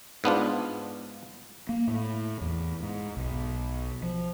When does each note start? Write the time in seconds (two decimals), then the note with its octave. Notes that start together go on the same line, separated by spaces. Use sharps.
0.24 G#2 B3 D4 F4
1.69 A#3
1.87 A2
2.41 E2
2.83 G#2
3.17 B1
4.03 F3